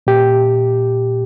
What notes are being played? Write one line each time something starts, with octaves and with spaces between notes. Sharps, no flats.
A#2 G4